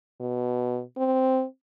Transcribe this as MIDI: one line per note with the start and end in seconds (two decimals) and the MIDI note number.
0.20 0.81 47
0.97 1.45 60